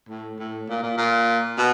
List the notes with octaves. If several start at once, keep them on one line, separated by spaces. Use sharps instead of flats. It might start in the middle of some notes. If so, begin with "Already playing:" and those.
A2
A2
A#2
A#2
A#2
B2